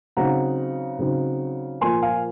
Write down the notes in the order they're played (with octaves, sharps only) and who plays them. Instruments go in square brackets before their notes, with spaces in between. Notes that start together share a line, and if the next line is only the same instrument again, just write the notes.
[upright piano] C#3 F#3 C4 D#4 F#5 A#5
C#3 F#3 C4 D#4
A#2 F3 A#3 G#5 C6
F5 G#5